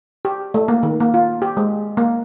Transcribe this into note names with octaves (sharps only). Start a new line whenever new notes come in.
G4
A3
A#3
D#3
A#3
F4
G4
G#3
A#3